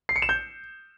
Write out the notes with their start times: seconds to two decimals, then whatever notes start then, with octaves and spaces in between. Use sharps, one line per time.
0.09 C7
0.16 C#7
0.22 E7
0.29 G6